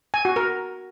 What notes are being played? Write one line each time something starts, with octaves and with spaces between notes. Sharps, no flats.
G#5
F#4
A#4